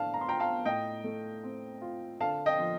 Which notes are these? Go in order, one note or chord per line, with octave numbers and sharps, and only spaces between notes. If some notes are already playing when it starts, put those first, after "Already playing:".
Already playing: A2 A3 D4 F5 A5
A#5
C6
F4 G5 A#5
F5 A5
A2 D#5 G5
A3
C4
F4
D3 F5 A5
D#5 G5
F3